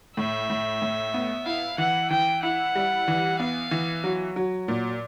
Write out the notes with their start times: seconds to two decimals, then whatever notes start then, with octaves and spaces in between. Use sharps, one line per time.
0.17 A2 E5
0.50 A2
0.82 A2
1.14 B3
1.46 E4 F5
1.78 E3 F#5
2.10 E3 G5
2.43 E4 F#5
2.75 G3
3.08 E3
3.40 B3 F5
3.71 E3
4.04 F#3
4.36 F#3
4.68 A#2